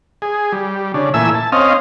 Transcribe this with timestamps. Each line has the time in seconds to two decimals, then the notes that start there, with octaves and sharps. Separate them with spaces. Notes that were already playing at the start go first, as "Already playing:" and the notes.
0.22 G#4
0.52 G3
0.94 C#3 D4
1.14 A#2 E3 A3 E5 G#5 E6
1.35 A5
1.52 C4 C#4 D#5 F5